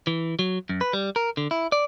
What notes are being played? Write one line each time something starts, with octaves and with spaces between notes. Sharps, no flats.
E3
F#3
F#2
B4
G3
A#4
D3
E4
D5